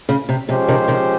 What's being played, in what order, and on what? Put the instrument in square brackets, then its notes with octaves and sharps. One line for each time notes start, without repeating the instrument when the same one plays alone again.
[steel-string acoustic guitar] C#3
C3
[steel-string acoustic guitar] C3 [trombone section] F3 G#3 C#4 G4 C5
[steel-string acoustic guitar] C3 D#3
C3 D#3